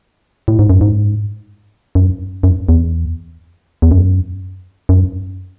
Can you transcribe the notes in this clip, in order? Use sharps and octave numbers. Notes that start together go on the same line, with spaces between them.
A2
G#2
F#2
G#2
F#2
F#2
E2
E2
F#2
F#2